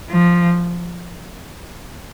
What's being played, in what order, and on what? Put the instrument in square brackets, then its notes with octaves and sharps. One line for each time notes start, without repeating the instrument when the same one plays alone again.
[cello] F3